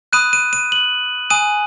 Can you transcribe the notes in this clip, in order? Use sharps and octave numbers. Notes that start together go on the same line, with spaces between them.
B5 D#6 F#6 D#7
D#7
D#7
F#7
G#5 D#6 F#6 D#7